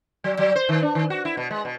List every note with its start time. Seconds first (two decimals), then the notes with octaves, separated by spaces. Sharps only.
0.24 F#3
0.39 F#3
0.55 C5
0.69 D#3
0.82 D4
0.95 D#3
1.10 F#4
1.25 E4
1.37 B2
1.51 G#3
1.65 B2